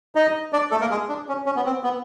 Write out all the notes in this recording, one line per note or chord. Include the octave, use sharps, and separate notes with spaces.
D#4 D#5
D4 D5
A3 A4
A#3 A#4
G#3 G#4
D4
C#4
C#4
B3
C4
B3